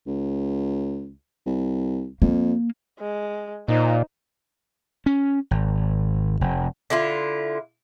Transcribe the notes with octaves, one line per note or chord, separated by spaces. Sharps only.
C#2
C2
F2 A#3
G#3
A#2 D#4 C5
C#4
G#1
F1
D3 E4 F4